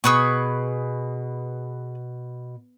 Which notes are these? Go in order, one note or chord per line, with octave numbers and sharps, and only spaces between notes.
B2 G#4 B4 C#6